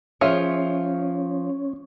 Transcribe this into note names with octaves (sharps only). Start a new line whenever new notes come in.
F3 C#4 F4 G#4 C#5 E5